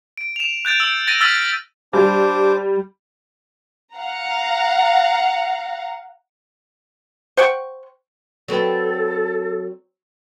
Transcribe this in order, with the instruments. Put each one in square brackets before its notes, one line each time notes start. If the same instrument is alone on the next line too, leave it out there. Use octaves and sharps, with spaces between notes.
[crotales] D7
E7 F7
F#6 G6 A6 D7
E6 G6 D7
A6 A#6 D7 D#7
E6 F6 A6 B6 D#7 F#7
[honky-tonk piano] G3 [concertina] D4 C5 D6
[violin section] F5 F#5 A#5
[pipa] C5 F#5 G5 C#6
[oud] F#3 C4 B4 [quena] A4